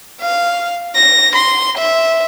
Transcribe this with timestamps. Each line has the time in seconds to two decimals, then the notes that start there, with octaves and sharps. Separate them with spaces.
0.22 F5
0.96 A#6
1.36 C6
1.78 E5